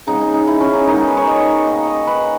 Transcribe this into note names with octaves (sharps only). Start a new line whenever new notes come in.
C#3 G#3 B3 D#4
D#4
D#4
E4
C#4
D#4
D#3 G#3 B3 D#4
G#4
B4
C#5
D#5
D#3 A#3 D#5
D#5
B4